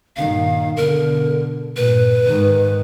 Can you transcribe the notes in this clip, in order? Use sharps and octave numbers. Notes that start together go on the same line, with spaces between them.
G2 A#2 D#3 F5
B2 D3 A#4
G2 A#2 B4
G#2 D#3